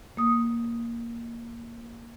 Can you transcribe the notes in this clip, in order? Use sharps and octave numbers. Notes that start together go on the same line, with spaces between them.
A#3 D#6